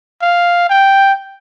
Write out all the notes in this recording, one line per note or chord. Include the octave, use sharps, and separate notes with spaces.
F5
G5